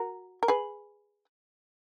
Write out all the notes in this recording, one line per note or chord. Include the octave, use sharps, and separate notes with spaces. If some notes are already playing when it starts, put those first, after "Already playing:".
Already playing: F#4 A#4
A#4
G#4 B4